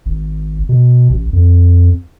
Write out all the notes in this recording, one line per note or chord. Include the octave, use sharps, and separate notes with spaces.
G#1
B2
A1
F2